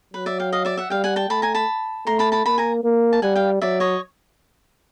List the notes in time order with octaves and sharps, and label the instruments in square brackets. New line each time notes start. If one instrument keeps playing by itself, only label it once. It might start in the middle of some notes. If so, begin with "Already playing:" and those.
[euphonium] F#3 [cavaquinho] B4
[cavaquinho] D5 E5
F5 G5
D#5 F5
D5 E5
E5 F#5
[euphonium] G3 [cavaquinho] F5 G5
[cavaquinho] F#5 G#5
G5 A5
[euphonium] A3 [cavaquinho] A5 B5
[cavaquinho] G#5 A#5
A5 B5
[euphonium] A3 [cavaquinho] A#5 C6
[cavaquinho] A5 B5
A5 B5
[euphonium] A#3 [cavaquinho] A5 B5
[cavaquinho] G#5 A#5
[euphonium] A#3
[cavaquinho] A5
[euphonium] G3 [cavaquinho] F#5 G#5
[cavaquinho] F5 G5
[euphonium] F#3 [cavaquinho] D5 E5
[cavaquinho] C#5 D#5